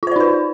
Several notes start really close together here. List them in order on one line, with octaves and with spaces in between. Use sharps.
F4 C5 D5 D#4 B4